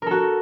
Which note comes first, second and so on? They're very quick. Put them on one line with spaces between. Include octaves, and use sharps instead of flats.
A#4 A4 F#4